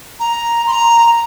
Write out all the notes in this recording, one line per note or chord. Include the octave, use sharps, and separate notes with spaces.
A#5
C6
A#5